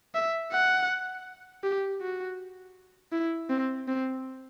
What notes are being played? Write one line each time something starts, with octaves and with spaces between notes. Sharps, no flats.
E5
F#5
G4
F#4
E4
C4
C4